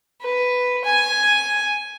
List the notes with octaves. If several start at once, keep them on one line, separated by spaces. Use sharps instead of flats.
B4
G#5